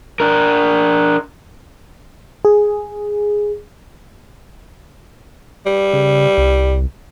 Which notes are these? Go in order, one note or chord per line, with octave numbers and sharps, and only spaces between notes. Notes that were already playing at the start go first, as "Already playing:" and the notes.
D4 A#4
G#4
G3
C#3
C2